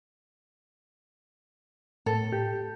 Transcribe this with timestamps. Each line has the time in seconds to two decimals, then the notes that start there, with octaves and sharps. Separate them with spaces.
2.06 A2 A4
2.32 G4